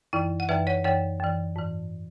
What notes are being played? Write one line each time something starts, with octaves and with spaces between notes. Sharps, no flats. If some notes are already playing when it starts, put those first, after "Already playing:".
F#2 E3 E4
F#5
F#2 E3 B4 E5
C#5 F#5
F#2 E3 C#5 F#5
F#2 E3
G#2 E3